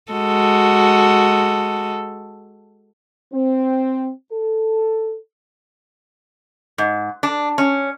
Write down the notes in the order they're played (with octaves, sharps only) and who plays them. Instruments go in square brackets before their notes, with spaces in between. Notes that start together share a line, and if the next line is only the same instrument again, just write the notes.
[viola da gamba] G#3 F#4 A4
[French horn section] C4
A4
[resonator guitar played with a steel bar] G#2
D4
C#4